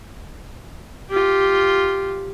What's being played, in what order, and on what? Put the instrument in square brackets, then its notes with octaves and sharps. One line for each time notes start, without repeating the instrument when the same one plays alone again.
[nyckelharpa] F4 G4